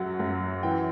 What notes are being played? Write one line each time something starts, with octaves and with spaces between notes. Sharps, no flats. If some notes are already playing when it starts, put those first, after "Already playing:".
Already playing: F#2 F#3 F#5
F#2
E3 G5